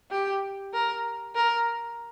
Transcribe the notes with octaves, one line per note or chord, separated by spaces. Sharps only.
G4
A#4
A#4